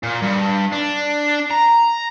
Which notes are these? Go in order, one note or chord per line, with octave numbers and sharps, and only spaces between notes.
A#2
G2
D4
A#5